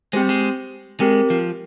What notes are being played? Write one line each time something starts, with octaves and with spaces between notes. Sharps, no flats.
G#3 C4 G4 C5
G3
G#3
G#3 C4 G4 A#4
F3